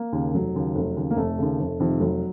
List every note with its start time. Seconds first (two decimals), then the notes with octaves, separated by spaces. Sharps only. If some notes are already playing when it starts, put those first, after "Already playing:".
Already playing: A#3
0.13 D#2 C#3
0.34 F1 F#3
0.55 D#2 C#3
0.75 F1
0.97 D#2 C#3
1.11 A#3
1.17 F1 A3
1.38 D#2 C#3
1.59 F1
1.80 F2 C3 D#3
2.00 F1 F#3